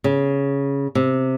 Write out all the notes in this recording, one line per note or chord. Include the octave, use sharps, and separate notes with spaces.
C#3
C3